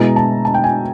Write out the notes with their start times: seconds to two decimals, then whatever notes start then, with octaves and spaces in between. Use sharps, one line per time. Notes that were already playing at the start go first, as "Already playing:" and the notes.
Already playing: B2 G#3 B3 E4 A#5
0.16 A5
0.45 A5
0.54 G5
0.64 G#5